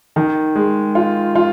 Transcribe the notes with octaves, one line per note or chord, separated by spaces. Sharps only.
D#3
G#3
F4
F4